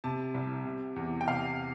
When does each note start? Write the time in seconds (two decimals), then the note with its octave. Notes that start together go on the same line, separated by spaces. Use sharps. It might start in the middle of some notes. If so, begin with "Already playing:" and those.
0.04 C3 A5
0.34 C2
0.65 C3
0.96 E2
1.21 G5
1.27 C3 F5